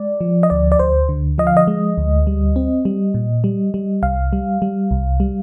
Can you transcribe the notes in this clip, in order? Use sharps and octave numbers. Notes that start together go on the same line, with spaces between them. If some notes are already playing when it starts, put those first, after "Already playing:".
Already playing: G#3 D5
F3
D#5
D2 D5
D5
D2 C5
D3
F3 D#5
F5
D#5
G#3
D2
G3
C4
G3
A#2
G3
G3
C2 F5
G3
G3
C2
G3